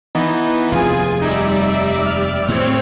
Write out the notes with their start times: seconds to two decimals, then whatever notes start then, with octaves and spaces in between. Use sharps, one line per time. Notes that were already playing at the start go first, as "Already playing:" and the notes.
0.15 E3 B3 D#4
0.72 F1 D#2 F4 G#4 G#5
1.22 G3 D#4 D5 E5
2.06 F6
2.48 A2 F#3 C4 C#5